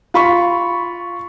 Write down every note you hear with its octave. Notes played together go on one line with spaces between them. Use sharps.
F4 B5 C#6